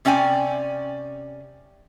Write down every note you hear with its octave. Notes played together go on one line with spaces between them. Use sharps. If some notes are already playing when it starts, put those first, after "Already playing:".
C3 C#4 D5 G5 G#5